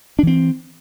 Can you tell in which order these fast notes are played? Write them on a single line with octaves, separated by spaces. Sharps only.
D4 E3 C4